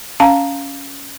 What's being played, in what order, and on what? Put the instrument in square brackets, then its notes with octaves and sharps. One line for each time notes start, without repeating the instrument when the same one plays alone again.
[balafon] C#4 F5 A5 A#5